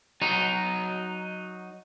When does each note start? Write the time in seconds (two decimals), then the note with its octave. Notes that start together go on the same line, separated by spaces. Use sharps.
0.22 F#3 D#4